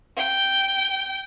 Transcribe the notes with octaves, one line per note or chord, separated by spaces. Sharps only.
G5